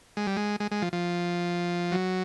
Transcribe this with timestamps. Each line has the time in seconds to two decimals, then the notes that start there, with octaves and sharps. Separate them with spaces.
0.17 G#3
0.27 G3
0.37 G#3
0.60 G#3
0.71 G#3
0.82 F3
0.93 F3
1.92 F#3